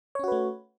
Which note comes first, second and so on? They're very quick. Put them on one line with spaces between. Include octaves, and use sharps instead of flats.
C#5 C#4 F#4 B4 A3